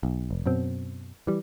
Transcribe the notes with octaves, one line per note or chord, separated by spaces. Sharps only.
B1
F1
F#2 B2 C4
E3 G3